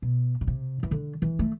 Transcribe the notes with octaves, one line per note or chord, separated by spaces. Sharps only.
B2
B2
C3
E3
D3
E3
A3